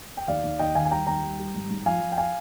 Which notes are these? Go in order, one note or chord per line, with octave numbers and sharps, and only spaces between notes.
G5
D#2 D5 F5
D#2
D#2 D#5 G5
D#3 F5 G#5
G#5
G3 G5 A#5
D#2 G5 A#5
G3
G3
G#1
G#2
F3 F5 G#5
F3
G5
F5 G#5